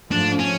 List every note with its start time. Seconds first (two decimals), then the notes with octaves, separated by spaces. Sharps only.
0.11 G#2 F3 A3 D4
0.39 C#4